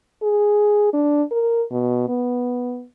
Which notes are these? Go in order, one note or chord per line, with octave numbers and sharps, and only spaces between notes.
G#4
D4
A#4
B2
B3